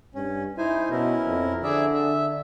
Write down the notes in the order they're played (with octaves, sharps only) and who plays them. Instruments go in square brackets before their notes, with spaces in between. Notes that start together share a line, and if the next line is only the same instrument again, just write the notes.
[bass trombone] G2 [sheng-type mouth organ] C#4
[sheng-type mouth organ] D#4 C5 G#5 [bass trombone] E4
[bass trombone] B2 [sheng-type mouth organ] C#4 E4 A#4
[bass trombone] F2
[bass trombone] D3 [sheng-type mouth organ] G#4 D5 E5
[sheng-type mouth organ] E5